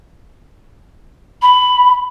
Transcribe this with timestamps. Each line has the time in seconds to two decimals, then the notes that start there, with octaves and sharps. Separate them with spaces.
1.42 B5